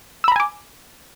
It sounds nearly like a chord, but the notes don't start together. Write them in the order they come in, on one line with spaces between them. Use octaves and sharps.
E6 B5 A#5 G#5 D6